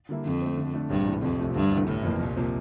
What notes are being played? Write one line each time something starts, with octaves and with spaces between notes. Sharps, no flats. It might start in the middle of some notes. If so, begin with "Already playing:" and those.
D3 G3 A#3 E4
F2 D3
A3 C4
D3
A3 D4
A#1 G2
A2 E3
C2 F2
C3 F3 A3
D2 G2
C3 E3 A3
G1 A2
F2 E3 A#3
C2 A#2
C3 F3 A#3